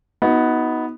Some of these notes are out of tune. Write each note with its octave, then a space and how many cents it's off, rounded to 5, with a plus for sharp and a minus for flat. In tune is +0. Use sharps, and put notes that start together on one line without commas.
B3 +0 D#4 +30 F#4 +0